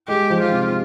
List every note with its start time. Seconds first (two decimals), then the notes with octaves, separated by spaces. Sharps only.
0.08 G#3 G4
0.30 F3
0.41 F4
0.52 C3